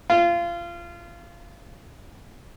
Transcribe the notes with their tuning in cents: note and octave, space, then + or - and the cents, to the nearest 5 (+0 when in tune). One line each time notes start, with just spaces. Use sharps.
F4 -25